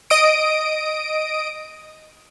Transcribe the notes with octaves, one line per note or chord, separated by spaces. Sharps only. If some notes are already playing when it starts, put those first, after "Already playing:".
D#5 D#6 D7